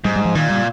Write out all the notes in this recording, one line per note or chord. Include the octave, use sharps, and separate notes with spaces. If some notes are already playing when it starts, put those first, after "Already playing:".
G#2 G3
G3
F3
A#2 D#3
G3